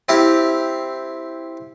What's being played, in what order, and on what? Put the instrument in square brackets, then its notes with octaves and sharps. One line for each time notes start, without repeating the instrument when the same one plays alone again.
[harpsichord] C4 E4 G4 F5